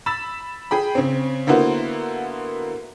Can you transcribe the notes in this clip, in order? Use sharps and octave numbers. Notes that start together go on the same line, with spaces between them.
B5 E6 A6 E7
G#4 G5 B5
C#3 C4
D3 A#3 B3 E4 F#4 C5